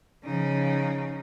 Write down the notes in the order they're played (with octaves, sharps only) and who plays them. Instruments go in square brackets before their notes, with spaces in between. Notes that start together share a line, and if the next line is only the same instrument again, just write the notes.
[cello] C#3 [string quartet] F3 D#4